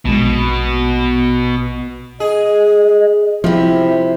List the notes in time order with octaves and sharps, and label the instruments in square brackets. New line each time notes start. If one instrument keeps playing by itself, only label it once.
[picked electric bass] A#1 G#3 [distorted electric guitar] B2
[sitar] G#4 [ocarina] D#5
[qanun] C3 B5 [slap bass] F3 [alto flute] E4